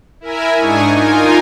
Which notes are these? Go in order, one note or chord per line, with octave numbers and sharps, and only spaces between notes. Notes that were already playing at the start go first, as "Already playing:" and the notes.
E4 A#4 E5 G#5
G#2 D4 D#4 G#5 C#6 D#6
D#4 F4 A#4 G#5